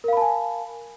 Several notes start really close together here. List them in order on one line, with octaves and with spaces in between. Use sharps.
A#4 F5 B5 A5 G#5